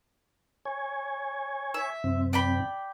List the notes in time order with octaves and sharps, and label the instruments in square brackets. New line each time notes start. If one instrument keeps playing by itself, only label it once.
[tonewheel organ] C#5 G#5
[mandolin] E5
[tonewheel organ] F#2 C3 C4
[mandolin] D5 G5 B5